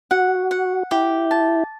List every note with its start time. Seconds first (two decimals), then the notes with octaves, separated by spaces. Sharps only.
0.11 F#4 F#5
0.51 F#5
0.91 E4 G4
1.31 A5